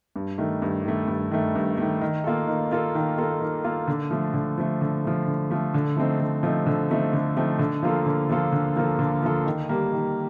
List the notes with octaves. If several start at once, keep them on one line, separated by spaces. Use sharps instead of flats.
G2
D#3 A3
G2
D#3 A3
G2
D#3 A3
G2
D#3 A3
D#3
A#3 F4 A4
D#3
A#3 F4 A4
D#3
A#3 F4 A4
D#3
A#3 F4 A4
D3
F3 A3
D3
F3 A3
D3
F3 A3
D3
F3 A3
D3
F3 A3 C4 D#4
D3
F3 A3 C4 D#4
D3
F3 A3 C4 D#4
D3
F3 A3 C4 D#4
D3
F3 A#3 F4 A4
D3
F3 A#3 F4 A4
D3
F3 A#3 F4 A4
D3
F3 A#3 F4 A4
D#3
G3 A#3
D#3